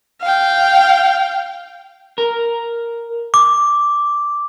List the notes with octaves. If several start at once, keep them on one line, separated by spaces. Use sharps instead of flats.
F5 G5
A#4
D6